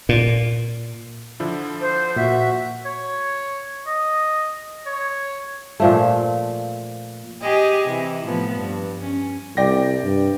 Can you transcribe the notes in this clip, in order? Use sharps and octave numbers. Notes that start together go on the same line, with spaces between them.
A#2
D3 F3 E4
C5
A#2 F#4 E5
C#5
D#5
C#5
A#2 F3 A3
G4 G#4 D#5
C3 E3
A2 F3 B3
G2
C#4
C2 D5 G5 A#6
G2